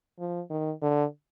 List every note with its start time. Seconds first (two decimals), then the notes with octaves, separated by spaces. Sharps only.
0.19 F3
0.50 D#3
0.82 D3